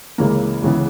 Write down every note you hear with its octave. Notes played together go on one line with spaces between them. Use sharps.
C#2 C#3 E3 A#3
C#2 C#3 E3 B3